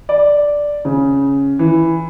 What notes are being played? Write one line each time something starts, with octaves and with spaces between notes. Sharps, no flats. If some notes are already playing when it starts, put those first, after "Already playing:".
D5
C#3
E3